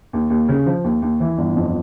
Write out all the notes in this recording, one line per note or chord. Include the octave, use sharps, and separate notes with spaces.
D#2
D#2
C#3
F3
D#2
D#2
E3
G1
F2